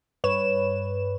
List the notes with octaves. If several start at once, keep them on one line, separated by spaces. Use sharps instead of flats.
G2 B4 C#5 E7